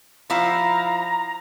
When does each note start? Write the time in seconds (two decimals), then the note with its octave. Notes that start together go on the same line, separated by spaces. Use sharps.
0.30 F3 E4 F5 A#5